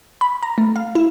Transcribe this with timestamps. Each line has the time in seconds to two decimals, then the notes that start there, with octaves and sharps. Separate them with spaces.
0.21 B5
0.43 A#5
0.58 A3
0.76 F5
0.95 E4